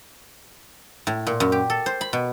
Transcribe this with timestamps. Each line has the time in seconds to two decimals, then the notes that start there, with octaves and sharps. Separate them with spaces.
1.07 A2
1.27 A#2
1.40 F#2
1.52 G4
1.70 A4
1.86 C5
2.01 B5
2.13 B2